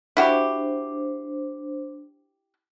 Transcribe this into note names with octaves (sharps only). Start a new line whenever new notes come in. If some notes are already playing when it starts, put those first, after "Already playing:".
D4 E4 F#4 G4 C5